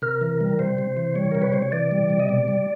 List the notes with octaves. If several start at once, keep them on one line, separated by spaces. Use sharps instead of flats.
C3 A#4
E3
G3
C3 C5
C3
E3
G3 C#5
C3 A#4
B4
C3 C5
C#5
E3 D5
G3
C3
D#5
B2 D5
G3